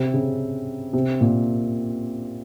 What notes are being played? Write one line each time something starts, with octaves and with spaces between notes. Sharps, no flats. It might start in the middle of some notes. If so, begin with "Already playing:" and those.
Already playing: C3
C#3
C3
A#2